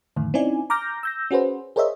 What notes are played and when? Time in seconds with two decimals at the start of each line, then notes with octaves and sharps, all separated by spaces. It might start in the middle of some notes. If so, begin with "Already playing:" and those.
0.16 F2 A2 D3 D#3
0.34 C4 C#4 D#4 E4 D5 G#5
0.70 A#5 D6 F6 G6 A#6
1.03 E6 G6 A#6
1.31 C#4 F#4 G#4 B4 C5
1.76 G#4 A#4 C5 C#5 D#5 E5